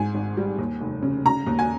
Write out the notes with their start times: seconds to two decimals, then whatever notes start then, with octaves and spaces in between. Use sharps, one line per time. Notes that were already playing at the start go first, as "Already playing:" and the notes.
Already playing: G#2 G#5
0.15 G#1
0.37 G3
0.58 D#2
0.81 F1
1.03 C#3
1.25 C#3 A#5
1.46 D#2
1.59 G#5